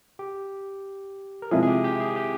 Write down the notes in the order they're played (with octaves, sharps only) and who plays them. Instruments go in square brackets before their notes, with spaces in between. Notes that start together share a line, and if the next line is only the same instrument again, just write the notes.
[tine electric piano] G4
A#4
[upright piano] C3 F3 G#3 E4 [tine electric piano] G#4
[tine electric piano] G#4
G4
G4
G#4
G4